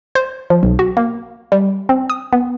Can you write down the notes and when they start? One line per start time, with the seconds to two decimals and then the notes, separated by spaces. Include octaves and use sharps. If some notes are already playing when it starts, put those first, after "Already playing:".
0.15 C5
0.50 F3
0.63 B1
0.79 F#4
0.97 A#3
1.52 G3
1.89 C4
2.10 D#6
2.33 B3